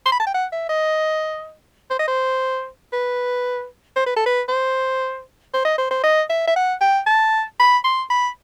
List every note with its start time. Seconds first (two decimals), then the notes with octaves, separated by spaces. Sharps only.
0.06 C6
0.12 B5
0.19 A5
0.26 G5
0.34 F#5
0.52 E5
0.69 D#5
1.90 C5
1.99 D#5
2.08 C5
2.93 B4
3.96 C5
4.06 B4
4.16 A4
4.26 B4
4.48 C5
5.54 C5
5.65 D#5
5.78 C5
5.90 C5
6.03 D#5
6.29 E5
6.47 E5
6.56 F#5
6.81 G5
7.06 A5
7.59 B5
7.84 C6
8.10 B5